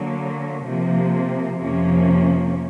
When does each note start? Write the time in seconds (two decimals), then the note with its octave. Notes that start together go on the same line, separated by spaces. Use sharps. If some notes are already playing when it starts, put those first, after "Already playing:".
Already playing: D3 F#3 A#3
0.65 C3 F3 A#3
1.60 F2 C3 F3 A#3 C#4